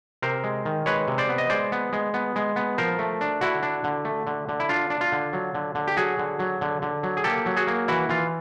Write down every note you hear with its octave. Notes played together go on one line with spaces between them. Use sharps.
C3 A#4 C5
G#3
D#3
G#3 B4 C#5
C3
C5 D5
B3
D#5
G#3 C5 D5
B3
G#3
B3
G#3
B3
F3 A#4 C5
A3
D4
D3 E4 F#4
D4
D3
A3
D3
D3
E4
D4 F4
D4
F4
D3
F#3
D3
D3
G4
F#3 F#4 G#4
D3
F#3
D3
D3
F#3
G#4
A#3 G4 A4
F#3
F#4 G#4
A#3
E3 E4 F#4
E3 F4